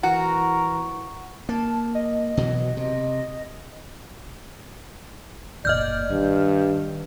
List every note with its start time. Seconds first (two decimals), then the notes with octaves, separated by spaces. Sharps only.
0.03 E3 F#4 A#4 F#5
1.49 A#3 A5
1.95 D#5
2.37 B2 E3 F#3
2.77 C3
5.65 F#1 A#2 D5 D#5 F6 G6
6.10 G2 D#3